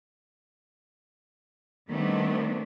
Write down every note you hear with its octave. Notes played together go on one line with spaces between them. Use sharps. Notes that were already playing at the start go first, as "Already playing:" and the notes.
D#3 G3 A3 B3 C4 D4